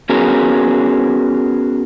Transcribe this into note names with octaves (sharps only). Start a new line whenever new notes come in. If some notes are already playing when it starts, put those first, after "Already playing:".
B3 C#4 F#4 G#4 A#4